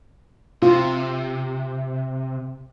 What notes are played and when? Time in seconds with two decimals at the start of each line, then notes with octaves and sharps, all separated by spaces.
0.62 C3 F4